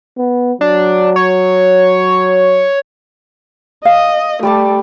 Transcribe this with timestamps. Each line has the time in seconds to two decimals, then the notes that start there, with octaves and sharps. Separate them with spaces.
0.18 B3
0.61 F#3 D4
1.16 C#5
3.85 D#5 F5
4.43 G3 A3 D5 A5